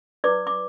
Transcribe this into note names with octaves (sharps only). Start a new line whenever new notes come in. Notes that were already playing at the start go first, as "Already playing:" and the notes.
E4 B4 D5 D6
D6